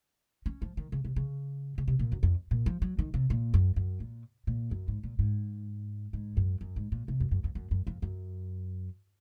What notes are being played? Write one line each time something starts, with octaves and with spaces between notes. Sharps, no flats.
C#4
F3
D#3
C#3
C3
C#3
C#3
C3
A#2
F#2
F2
A#2
F3
F#3
D#3
C3
A#2
F#2
F#2
A#2
A#2
F#2
G#2
A#2
G#2
G#2
F#2
F#2
G#2
A#2
C3
F#2
F#2
F2
F#2
F#2
F2
F#2